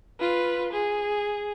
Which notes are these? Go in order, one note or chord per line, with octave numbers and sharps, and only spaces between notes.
F4 B4
G#4